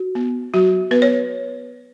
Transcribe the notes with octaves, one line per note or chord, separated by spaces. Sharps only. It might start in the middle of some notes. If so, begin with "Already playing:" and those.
Already playing: F#4
B3
F#3 F#4
B3 B4
C#5